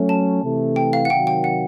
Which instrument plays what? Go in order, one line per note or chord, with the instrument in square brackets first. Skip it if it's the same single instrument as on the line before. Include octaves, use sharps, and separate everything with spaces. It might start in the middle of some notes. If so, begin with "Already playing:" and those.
Already playing: [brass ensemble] F#3 A3 C#4
[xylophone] A5
[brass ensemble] C3 E3 A3
[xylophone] G5
F5
F#5
[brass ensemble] C3 D#3 F#3 [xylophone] G5
[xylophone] G5
F#5